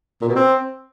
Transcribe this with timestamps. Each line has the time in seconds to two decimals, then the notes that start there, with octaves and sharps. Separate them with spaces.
0.22 A#2
0.29 B2
0.36 C4